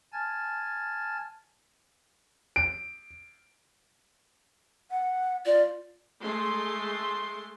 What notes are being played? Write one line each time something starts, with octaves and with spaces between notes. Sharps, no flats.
G#5 A5 F6 G#6 A6
D7
F#5
F4 D5
G#3 A3 C6